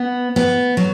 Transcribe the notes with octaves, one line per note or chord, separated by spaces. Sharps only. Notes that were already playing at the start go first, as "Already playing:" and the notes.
Already playing: B3
B3
F#3